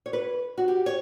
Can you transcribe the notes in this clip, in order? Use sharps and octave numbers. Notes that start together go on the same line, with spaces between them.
C#5
B4
F#4
G4
C#5